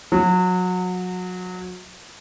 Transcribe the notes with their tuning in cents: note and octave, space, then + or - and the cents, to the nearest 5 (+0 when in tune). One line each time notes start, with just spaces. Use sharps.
F#3 -25